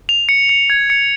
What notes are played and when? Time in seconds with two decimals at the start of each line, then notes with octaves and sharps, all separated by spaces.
0.09 F7
0.29 C#7
0.49 C#7
0.70 G#6
0.90 C#7